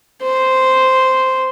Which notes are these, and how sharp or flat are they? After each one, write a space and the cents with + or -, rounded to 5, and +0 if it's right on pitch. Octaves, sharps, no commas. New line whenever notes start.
C5 -5